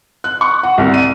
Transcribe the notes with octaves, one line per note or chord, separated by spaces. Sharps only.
F#6
C#6
F#5
C2
D#7